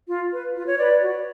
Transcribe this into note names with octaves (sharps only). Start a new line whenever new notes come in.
F4
B4
F4
C#5
B4 D5
F#4